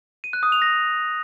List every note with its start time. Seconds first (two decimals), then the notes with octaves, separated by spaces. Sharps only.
0.24 D#7
0.33 F#6
0.43 D#6
0.52 F7
0.62 A#6